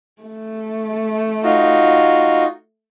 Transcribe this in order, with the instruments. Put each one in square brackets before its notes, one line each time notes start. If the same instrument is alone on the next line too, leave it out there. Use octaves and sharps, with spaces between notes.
[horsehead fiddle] A3
[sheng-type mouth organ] D#4 F4 F#4